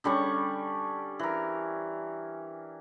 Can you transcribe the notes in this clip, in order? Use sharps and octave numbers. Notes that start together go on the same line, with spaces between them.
D3 G3 C#4 C#6
E3 A#4